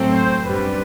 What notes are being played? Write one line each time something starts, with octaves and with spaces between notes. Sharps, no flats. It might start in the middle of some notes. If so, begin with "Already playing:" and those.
Already playing: A2 F#3 A3 C4
C5
F#2 D3 G3 C4 B4